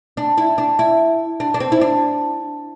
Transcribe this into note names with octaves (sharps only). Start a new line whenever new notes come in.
D4
E4
D4
E4
D4
D4
C4
E4
D4